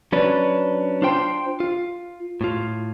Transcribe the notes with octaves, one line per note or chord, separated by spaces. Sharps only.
F#3 C#4 D4 B4
D4 F4 C5 G5 C6
F4
A2 F4